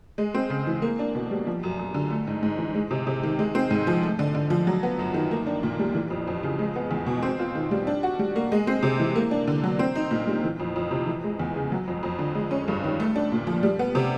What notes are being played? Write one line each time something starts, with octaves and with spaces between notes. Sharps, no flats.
G#3
C4
C#3
E3
A#3
D4
B2
G3
F3
F#2
F#2
D3
A3
G#2
G#2
E3
G#3
C3
C3
D#3
G#3
C4
G#2
F3
A3
D3
D3
F3
F#3
B3
F#2
D#3
A#3
D4
A#2
G3
E3
F2
F2
C#3
G#3
B3
E2
B2
C4
F4
D#3
G3
D4
F#4
G3
A#3
G#3
C4
C3
E3
A#3
D4
D3
F#3
C4
D#4
A#2
G3
E3
F2
F2
C3
E3
G#3
E2
C#3
F#3
F2
F2
D3
G#3
C#4
G2
D#3
A3
D4
A#2
F3
G3
B3
C3